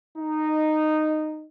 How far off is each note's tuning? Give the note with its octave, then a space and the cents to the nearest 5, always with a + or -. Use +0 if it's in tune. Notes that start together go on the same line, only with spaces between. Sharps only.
D#4 -10